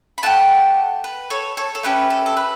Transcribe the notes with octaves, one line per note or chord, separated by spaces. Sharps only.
B5
A3 E4 G4 F#5 A5
B4
A4 C#5
A4 C#5
A4
A3 C#4 G4 B4
A4
A4
B4